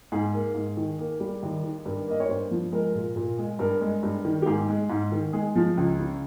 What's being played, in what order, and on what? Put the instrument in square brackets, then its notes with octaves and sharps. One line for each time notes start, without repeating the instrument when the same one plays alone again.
[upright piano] G#2 G#4
A#3
G#2
D#3
A#3 G#4
G3
D#2
D#3
G2 A#4
A#3 D#5
C#5
G2 C5
F3
G#3 A#4
A#2
A#2
G#3
G2 A#4
G#3
G2
D#3
G4
G#2 G#4
G#3
G#2
D#3
G#3 G#4
F3
C#2
C#3